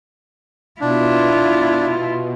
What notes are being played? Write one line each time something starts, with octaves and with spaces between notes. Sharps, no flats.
B2 D4 E4 F4